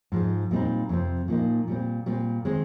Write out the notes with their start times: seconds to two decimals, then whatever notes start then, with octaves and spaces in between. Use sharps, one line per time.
0.12 G#2 F3 G#3
0.51 A#2 G3 C4 D#4
0.89 F2 C3 F3 C4
1.28 A#2 F3 A#3 D#4
1.67 A#2 G3 C4
2.06 A#2 G3 C4
2.45 D#3 G#3 C4 D#4